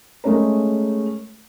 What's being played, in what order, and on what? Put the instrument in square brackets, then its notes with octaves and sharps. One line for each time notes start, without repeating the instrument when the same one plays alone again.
[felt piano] G#3 A3 C#4 A#4